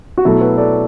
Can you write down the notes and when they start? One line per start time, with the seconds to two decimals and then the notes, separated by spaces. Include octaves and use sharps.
0.17 F#4
0.25 B2 F#3 A3 E4 A4
0.41 F#4 B4
0.57 A4 D5